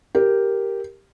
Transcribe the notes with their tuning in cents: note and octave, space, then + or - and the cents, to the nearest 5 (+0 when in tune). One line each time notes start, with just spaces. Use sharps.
G4 +0 A#4 +0